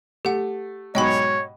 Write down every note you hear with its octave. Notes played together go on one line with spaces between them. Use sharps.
A3 G4 F#5
G#2 B2 F#3 C#5 D#5 G5 B5